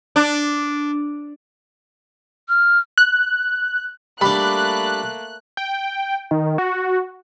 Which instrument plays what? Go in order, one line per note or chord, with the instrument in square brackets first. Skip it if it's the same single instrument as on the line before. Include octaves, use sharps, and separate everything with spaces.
[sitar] D4
[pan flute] F6
[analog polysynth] F#6
[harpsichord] G3 D4 [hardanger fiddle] A3 A#3 [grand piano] B5 [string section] F#6
[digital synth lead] G5
D#3
F#4